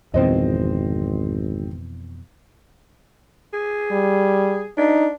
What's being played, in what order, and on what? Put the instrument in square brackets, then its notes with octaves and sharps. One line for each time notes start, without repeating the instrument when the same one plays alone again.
[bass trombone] G#1 [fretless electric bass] F2 B2 E3 [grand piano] C4 C5 D#5
[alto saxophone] G#4
[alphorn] G3
[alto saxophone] D4 [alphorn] D#4